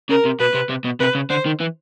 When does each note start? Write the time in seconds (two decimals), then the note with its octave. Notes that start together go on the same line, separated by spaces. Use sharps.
0.10 C#3 A#4
0.25 C3
0.40 B2 B4
0.54 C3
0.69 C3
0.84 B2
1.00 C3 B4
1.15 C#3
1.30 D3 C5
1.46 D#3
1.60 E3